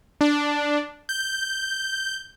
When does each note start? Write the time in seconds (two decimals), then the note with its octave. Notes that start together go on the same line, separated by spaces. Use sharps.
0.21 D4
1.09 G6